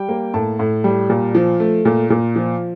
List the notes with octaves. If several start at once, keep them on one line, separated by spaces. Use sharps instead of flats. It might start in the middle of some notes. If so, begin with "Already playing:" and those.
Already playing: G3 G5
A#3
A2 A5
A2
G3
A#2
F3
A3
A#2
A#2
F3